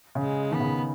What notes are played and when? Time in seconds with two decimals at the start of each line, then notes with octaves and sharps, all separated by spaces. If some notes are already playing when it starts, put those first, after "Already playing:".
0.15 C#3
0.23 G#3
0.51 D#3 B3
0.61 C#3